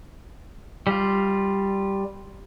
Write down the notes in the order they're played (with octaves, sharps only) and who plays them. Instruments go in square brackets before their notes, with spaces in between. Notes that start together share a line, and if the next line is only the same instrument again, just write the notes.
[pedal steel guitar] G3 F4